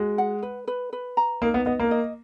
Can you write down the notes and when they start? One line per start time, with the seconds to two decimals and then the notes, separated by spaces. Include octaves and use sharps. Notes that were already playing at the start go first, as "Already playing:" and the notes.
Already playing: G#3 F#4
0.18 F#5
0.43 B4
0.67 B4
0.93 B4
1.17 A#5
1.42 A#3 D#4
1.54 B3
1.66 B3 D#5
1.79 A#3
1.91 D#5